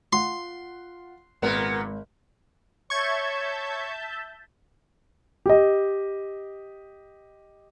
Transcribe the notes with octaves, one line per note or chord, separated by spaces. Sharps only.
F4 F#5 C6
G#1 A#2 B3 A#4
C#5 E5 A5 C#6 G6 G#6
G4 D#5